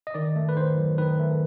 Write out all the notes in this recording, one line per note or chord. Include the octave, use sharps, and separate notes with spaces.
D#5
D#3 D5
A3
B4
D#3 C5
F#3
D#3 B4
A3